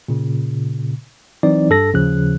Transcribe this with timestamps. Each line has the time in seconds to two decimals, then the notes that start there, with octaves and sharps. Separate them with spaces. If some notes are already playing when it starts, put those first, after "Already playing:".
0.08 A#2 C#3
1.43 E3 F#3 C4 D#4 D5
1.70 G2 A4 A#6
1.94 D#2 C#3 F3 F#6